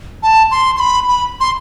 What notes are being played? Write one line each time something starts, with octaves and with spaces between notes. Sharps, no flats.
A5
C6
C6
B5
B5
C6